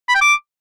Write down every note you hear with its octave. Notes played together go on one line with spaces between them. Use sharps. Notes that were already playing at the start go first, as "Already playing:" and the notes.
B5
G5
D6